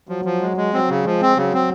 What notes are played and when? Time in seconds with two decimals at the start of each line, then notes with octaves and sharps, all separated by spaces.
0.09 F3 F#3
0.25 F3
0.41 G#3
0.57 G#3
0.73 F#3 C4
0.89 C#3
1.05 F3 G#3
1.22 C4
1.37 C#3 F#3
1.53 C4